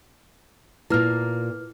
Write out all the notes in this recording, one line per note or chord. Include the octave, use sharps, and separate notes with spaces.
A#2 A#3 E4 B4 F6